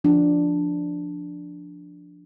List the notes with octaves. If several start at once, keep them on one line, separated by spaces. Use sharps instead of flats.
F3 D4